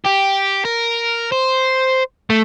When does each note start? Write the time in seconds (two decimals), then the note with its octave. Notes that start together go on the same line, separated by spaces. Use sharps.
0.06 G4
0.65 A#4
1.32 C5
2.30 A3